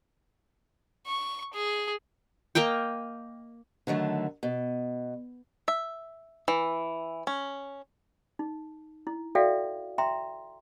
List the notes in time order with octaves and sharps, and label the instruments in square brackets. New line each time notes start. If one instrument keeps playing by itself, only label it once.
[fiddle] C#6
G#4
[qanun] A#3 A#4 D#5 G5
[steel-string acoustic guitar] D3 D#3 F#3 A3
B2
[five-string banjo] E5
E3
C#4
[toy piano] D#4
E4
F#4 A4 D5 E5 F5 G5
E5 G5 A#5 C6